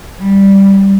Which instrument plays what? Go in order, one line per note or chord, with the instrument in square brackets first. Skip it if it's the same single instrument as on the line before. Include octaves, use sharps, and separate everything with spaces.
[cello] G3